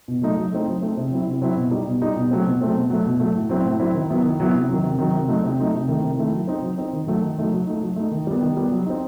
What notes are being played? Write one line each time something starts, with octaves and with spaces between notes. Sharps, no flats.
B2
F#3 A3 D#4
F#3
A3 C4 D#4
F#3
A3 C4 D#4
C3
F#3 C4 E4
C3
F#3 C4 E4
B2
G3 D#4
B2
G3 D#4
B2
F#3 A3 C4
B2
F#3 A3 C4
B2
F#3 A3
B2
F#3 A3
A2
F#3 C4 E4
A2
F#3 C4 E4
D#3
F#3 B3 E4
D#3
F#3 B3 E4
C3
D#3 F#3
C3
D#3 F#3
C3
F#3 A3 D#4
C3
F#3 A3 D#4
C3
D#3 A3 E4
C3
D#3 A3 E4
F#3
C4 D#4
F#3
C4 D#4
D#3
F#3 A3 D#4
D#3
F#3 A3 D#4
F#3
A3 D#4
F#3
A3 D#4
D#3
G3 B3
D#3
G3 B3
F#3
C4 D#4